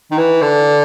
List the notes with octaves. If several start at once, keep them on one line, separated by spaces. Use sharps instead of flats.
D#3
E3
D3